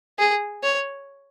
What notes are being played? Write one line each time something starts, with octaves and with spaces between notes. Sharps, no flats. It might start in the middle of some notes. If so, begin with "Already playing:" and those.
G#4
C#5